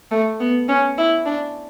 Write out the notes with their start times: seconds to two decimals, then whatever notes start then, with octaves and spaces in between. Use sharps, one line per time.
0.11 A3
0.40 B3
0.69 C#4
0.98 E4
1.26 D4